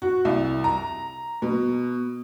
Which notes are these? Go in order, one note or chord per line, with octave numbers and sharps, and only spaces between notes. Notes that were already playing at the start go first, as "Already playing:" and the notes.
F#4
C2
A#5
B2